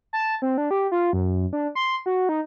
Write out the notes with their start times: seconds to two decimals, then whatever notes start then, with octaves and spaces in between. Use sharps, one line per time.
0.13 A5
0.42 C4
0.58 D4
0.71 G4
0.92 F4
1.13 F#2
1.53 D4
1.75 C6
2.06 F#4
2.29 D#4